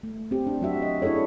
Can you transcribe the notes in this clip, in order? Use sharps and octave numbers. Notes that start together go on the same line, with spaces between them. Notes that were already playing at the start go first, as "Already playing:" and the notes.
A3
C4 G4
D4
F#3 F#4 E5
D#5
D4 E4 G#4 A4 C#5